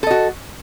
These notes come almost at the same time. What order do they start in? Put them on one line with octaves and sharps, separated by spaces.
A4 D#5 F#4